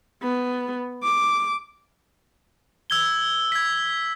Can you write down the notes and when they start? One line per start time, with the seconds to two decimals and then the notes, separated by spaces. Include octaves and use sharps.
0.23 B3
1.03 D6
2.90 E6 G#6 G7
3.52 G#6 B6